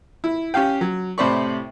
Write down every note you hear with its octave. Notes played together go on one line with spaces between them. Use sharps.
E4
C#4 G4 F5 G5
F#3
A2 C3 C5 D5 B5 C#6